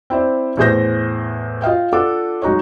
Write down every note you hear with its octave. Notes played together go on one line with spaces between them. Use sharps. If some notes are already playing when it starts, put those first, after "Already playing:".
C4 E4 C5 D5
E2 A2 G#4 C5 G6 A#6
F4 D#5 F5 G5
D4 F4 A4 F#5 D6
F#3 G#3 D#4 F#4 C#5